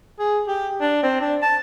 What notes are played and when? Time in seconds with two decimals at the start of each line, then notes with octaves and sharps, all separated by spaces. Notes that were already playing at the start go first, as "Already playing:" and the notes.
0.19 G#4
0.48 G4
0.81 D4
1.03 C4
1.21 D4
1.42 A5